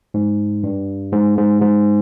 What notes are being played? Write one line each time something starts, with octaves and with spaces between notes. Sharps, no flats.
G#2
G2
G#2
G#2
G#2